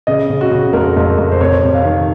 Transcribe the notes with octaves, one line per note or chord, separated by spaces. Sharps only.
C#3 D#5
C#3
F#4
C#3
F2 A#4
F2
F2
C5
C3 C#5
C3
F5
D#3